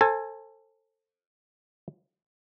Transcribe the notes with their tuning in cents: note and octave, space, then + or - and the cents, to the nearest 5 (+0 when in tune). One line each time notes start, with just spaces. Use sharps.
A4 +20 C5 +30 G#5 +0